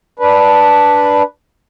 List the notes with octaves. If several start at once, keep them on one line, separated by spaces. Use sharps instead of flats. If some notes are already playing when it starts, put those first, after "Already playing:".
D4 B4